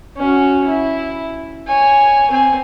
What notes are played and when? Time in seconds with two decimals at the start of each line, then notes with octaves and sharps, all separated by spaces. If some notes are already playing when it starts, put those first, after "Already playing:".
0.17 C#4 F#4
0.67 E4
1.67 C#5 G#5
2.31 C4 G#5